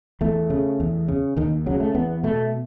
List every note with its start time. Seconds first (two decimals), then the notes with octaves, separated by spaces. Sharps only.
0.21 E2 A3
0.50 C#3
0.80 E2
1.08 C#3
1.37 D#2 D#3
1.66 C#3 F#3
1.80 A3
1.94 E2 B3
2.23 B2 A3